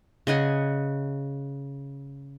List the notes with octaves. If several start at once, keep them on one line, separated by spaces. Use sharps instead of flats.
C#3 D#5 F#5 G#5